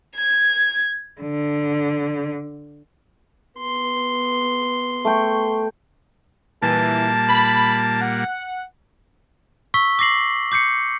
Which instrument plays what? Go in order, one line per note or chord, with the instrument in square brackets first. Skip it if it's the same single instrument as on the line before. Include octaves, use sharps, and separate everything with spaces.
[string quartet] G#6
D3
[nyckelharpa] B3 C6
[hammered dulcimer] A3 G5 C#6
[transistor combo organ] A#2 G3 A#3 [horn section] E3 [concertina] A5
[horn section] B5
F#5
[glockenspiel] C#6 E6 B6 G7
D6 A#6 C7 F#7
D6 G6 C7 C#7